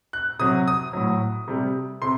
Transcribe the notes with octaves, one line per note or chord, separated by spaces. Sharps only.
F#6
C3 F#3 D#6
D#6
A2 F#3
C3 G3
C3 C6